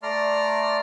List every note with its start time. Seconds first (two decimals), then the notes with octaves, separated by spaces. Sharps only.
0.03 A3 D5 A#5 C6 F6